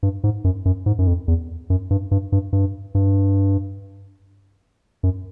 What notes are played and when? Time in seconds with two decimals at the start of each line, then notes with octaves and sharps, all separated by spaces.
0.03 G2
0.24 G#2
0.44 F#2
0.65 F#2
0.86 G#2
0.99 F#2
1.07 F2
1.28 E2
1.70 F#2
1.90 G2
2.11 G2
2.32 G2
2.53 G2
2.95 G2
5.03 F#2